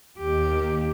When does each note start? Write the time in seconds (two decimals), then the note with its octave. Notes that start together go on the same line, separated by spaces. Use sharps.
0.18 D#2 G4